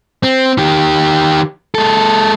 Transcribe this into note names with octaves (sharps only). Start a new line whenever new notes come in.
C4
D#3 G4
G#3 A4